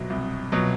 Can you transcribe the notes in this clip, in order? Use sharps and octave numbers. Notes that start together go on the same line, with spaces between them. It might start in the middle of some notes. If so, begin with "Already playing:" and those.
Already playing: C2 B2 F#3
C2
B2 F#3